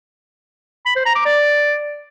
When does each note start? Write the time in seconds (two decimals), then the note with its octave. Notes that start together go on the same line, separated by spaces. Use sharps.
0.86 B5
0.96 C5
1.06 A#5
1.16 D6
1.26 D5